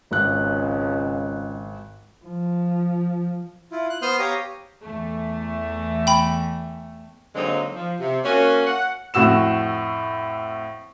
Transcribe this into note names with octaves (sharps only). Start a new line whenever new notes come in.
G#1 C#2 F#6
F3
E4 F4
F#6
B3 C5 C6 D#6 F6 G6
G4 C#5 F5 G5 A#5 D#6
E2 A3
G5 B5
D3 F#3 G#3 A#3 C4 D#4
F3
C3
A#3 C#4 F#4
F#5
F2 A2 F#4 E6 E7